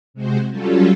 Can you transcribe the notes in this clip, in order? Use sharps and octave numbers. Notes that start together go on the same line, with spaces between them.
C3 G#3 F#4 C5
F#3 G3 C#4 F4 A4